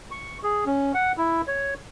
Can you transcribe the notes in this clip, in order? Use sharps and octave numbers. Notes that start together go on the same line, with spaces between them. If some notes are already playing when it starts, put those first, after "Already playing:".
C#6
G#4
C#4
F#5
E4
C#5